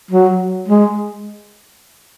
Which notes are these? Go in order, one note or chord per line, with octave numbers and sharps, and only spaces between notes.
F#3
G#3